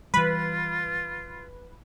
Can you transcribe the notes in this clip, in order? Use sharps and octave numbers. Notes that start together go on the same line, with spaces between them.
E3 G3 F4 B4